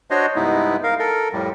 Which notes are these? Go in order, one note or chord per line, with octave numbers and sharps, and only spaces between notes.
D4 F#4 C5 C#5 D#5
G2 C3 G#3 B3 D#4 E4
A#4 F5
A4 A#4
F2 A2 G3